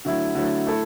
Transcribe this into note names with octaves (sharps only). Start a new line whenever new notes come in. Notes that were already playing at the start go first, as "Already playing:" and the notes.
D3 F#3 A3 E4
D3 F#3 A3 E4
A3 E4 A4